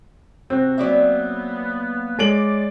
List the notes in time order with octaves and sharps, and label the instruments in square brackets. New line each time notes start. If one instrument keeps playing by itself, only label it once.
[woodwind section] C3 F#4 [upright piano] C4
[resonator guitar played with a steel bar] F#3 D5 E5 [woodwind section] A#3 B3
[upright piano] G#3 D7 F#7 [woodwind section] C#5 D5